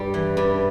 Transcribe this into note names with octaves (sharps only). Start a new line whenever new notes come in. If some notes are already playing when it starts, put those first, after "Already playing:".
Already playing: G2 G3
E3
G2